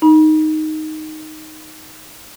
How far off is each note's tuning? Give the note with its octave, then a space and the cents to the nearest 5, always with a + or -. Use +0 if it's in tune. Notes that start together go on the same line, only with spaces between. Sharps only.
D#4 +0 B5 -45